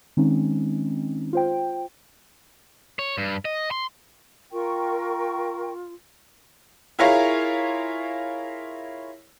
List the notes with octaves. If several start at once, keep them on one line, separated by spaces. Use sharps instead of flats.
D#3 G#3 C4 C#4 D#4
F4 C5 G5
C#5
G2
D#5
C6
F4 A#4 G5 C#6
E4 F4 G#4 A#4 C#5 F5